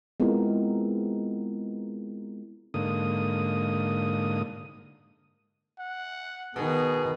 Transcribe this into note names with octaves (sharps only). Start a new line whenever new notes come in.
G#3 B3 C4 E4 F4 A#4
G#2 D3 A#3 D#6
F#5
B2 D#3 B3 G#4